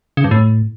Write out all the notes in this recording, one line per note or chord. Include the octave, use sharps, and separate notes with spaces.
C#3
G2
A2